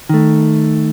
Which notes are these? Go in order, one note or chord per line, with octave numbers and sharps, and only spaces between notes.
D#3 A3